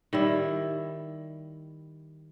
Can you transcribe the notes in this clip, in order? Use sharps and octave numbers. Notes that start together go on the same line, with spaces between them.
D#3 G3 E4